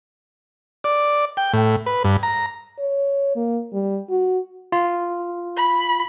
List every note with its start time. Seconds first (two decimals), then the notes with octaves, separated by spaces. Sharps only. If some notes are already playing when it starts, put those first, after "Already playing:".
0.84 D5
1.37 G5
1.53 A2
1.86 B4
2.04 G2
2.23 A#5
2.79 C#5
3.36 A#3
3.73 G3
4.10 F#4
4.72 F4
5.57 B5